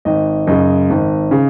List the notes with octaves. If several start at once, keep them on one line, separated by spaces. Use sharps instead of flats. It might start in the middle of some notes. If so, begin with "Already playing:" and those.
G#1 D#5
F#2 C#3 D#5
G#1
C#3